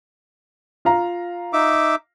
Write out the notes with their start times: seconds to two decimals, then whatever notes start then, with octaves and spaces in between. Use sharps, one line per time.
0.85 F4 F5 A#5
1.53 D#4 E5 D6